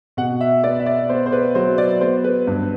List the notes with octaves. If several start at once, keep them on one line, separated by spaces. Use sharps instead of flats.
B2 F#5
E5
B3 D5
E5
D5
B3 C5
C5
B4
F#3 C5
D5
B3 C5
B4
G2